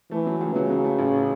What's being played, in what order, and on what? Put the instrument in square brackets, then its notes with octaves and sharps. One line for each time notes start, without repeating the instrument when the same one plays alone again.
[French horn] E3 [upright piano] A3
[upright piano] F#3
C#2
[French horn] C#3 [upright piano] F#3
[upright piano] F#3
A3
A1
A2